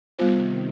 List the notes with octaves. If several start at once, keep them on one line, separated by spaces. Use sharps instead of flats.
C3 D#3 G3 B3 F4 C5